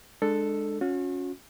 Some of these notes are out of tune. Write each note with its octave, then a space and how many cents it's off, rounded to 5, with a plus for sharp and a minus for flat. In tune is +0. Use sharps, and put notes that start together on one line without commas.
G#3 +0 D4 +25 A4 +5
C#4 +0 F#4 -40